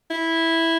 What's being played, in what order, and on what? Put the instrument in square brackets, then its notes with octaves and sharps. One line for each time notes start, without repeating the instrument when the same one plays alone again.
[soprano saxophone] E4